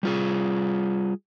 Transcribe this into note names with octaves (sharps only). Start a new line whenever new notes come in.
G3 F4 G#4